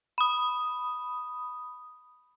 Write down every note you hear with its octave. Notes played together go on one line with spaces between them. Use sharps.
B5 D#6